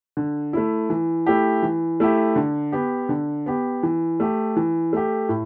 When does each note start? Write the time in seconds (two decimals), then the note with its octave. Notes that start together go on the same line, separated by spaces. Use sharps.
0.17 D3
0.53 A3 E4
0.90 E3
1.26 A3 E4 G4
1.63 E3
2.00 A3 E4 G4
2.36 D3
2.72 B3 G4
3.09 D3
3.46 B3 G4
3.83 E3
4.20 A3 G4
4.56 E3
4.93 A3 G4
5.29 A2